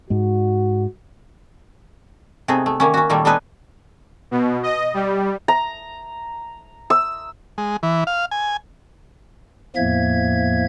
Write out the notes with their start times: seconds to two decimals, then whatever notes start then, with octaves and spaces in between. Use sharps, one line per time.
0.10 G#2 G#3 F#4
2.48 C3 A3 B3 D#4 G#4
2.66 A3
2.80 D#3 A#3 C#4
2.94 C#4 F#4
3.10 A#2 D#3 G3 A3 A#3 A4
3.25 B3 D4 D#4 A4 B4 G#5
4.31 B2
4.63 D#5
4.94 G3
5.48 A#5
6.90 E6
7.58 G#3
7.83 E3
8.07 F5
8.31 G#5
9.76 E2 A2 F3 A#3 E5 G#6